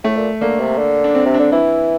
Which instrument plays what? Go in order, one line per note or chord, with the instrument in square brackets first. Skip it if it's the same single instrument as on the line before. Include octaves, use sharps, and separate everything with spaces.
[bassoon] A2 [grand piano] A3
[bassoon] A#2
[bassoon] D3 [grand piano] A#3
[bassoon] C3
D3
[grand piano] D4
C4
[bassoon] C3
[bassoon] D3 [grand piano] D4
[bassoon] E3 [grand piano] E4